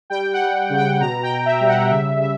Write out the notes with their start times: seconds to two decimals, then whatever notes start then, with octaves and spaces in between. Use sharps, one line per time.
0.10 G3 G5
0.33 F#5
0.40 G3
0.70 C#3
0.77 G5
1.00 B2 A#5
1.23 G5
1.30 B2
1.46 E5
1.60 G3
1.68 F#5
1.91 C#3 E5
2.20 C#3 E5